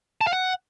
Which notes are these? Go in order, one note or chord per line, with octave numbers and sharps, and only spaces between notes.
A5
F5
F#5